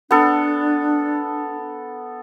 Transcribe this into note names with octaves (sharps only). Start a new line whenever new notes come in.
B3 D4 A4